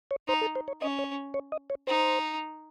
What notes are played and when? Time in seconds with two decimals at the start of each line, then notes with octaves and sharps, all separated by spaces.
0.11 C#5
0.28 D#4 C5
0.42 A4
0.55 C5
0.68 C#5
0.81 C#4 D#5
0.99 C#5
1.34 C#5
1.52 D#5
1.70 C#5
1.87 D#4 C5